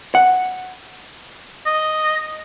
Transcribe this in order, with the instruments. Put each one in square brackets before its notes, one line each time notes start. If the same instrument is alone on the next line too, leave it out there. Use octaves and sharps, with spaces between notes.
[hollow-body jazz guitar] F#5
[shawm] D#5